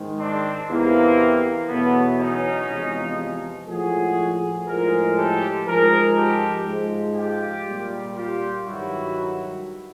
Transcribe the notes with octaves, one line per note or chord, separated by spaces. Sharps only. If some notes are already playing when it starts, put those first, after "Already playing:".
Already playing: G#2 D#3 G#3
C4 D4
E2 C3 E3 A#3
E2 B2 F#3 A3 B3
C#4 D#4
E2 C3 F3 G#3
A2 F3 G#3 F#4 G#4
A2 F3 G#3 G#4 A#4
G4 A4
G#2 F3 G#3 G#4 A#4
G4 A4
G#2 F3 G#3
F4 G4
A#2 G3
F4 G4
G2 D#3 F#3 E4 F#4